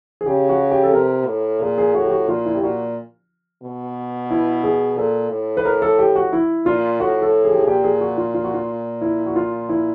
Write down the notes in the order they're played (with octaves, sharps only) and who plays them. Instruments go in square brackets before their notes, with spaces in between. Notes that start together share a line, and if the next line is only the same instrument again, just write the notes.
[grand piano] G#4
[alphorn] C#3 [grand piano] G4
[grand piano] F#4
G4
A4
[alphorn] C3 [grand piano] A#4
[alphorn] A2
[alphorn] A#2 [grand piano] G#4
[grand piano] G#4
[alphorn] A2 [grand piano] F#4
[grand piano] G4
F#4
[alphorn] A#2 [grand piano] F4
[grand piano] E4
G4
[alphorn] A#2 [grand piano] F#4
[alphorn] B2
[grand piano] E4
G#4
[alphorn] A#2 [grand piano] A4
[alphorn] A2
[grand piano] B4
A#4
A4
G4
F#4
E4
[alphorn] A#2 [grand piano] F4
[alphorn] A2 [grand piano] F#4
[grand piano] A4
G#4
G4
G#4
[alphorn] A#2 [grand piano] G4
[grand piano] G#4
F#4
F4
F4
F#4
F4
E4
F#4
F4
E4